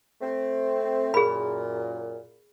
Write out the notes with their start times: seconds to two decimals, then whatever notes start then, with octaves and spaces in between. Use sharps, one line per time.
0.21 A3 C4
1.14 F#2 A#2 G#4 B5